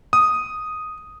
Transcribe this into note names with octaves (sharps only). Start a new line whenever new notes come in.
D#6